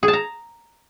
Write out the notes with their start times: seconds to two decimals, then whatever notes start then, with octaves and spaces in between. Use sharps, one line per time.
0.03 G#4
0.08 A5
0.13 A#5